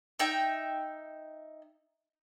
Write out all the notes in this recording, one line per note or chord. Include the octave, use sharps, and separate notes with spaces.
D#4 E5 G5